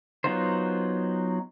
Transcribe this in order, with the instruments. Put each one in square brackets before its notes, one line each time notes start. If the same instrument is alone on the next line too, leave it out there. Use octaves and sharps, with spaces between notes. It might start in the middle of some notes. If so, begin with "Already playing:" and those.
[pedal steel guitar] F#3 B3 D#4 F4 C5